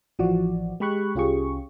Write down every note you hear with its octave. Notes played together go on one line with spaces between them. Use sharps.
A1 E3 F3 F#4 D5
G#3 G4 B5 C#6 F#6
C2 C#4 F4 G4 G#4 C#6